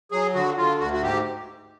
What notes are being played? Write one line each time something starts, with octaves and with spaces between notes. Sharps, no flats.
F#3 G#4
D3 F#4
D3 F4
D2 F#4
F#4
G#2 G4